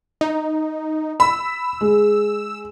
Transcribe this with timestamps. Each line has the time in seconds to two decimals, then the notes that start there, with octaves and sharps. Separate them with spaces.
0.21 D#4
1.20 B5 E6
1.81 G#3